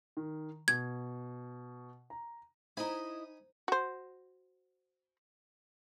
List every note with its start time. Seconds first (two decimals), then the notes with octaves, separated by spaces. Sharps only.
0.17 D#3
0.68 B2 G#6
2.10 A#5
2.77 D#4 E4 C5 D#5 G#5 A#5 B5
3.68 F#4 C5